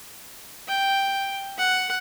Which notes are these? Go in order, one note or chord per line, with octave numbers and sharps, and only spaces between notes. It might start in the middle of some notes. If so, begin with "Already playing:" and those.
G5
F#5